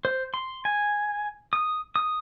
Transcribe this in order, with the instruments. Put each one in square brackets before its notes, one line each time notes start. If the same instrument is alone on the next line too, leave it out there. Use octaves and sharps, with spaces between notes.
[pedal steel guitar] C5
C6
G#5
D#6
D#6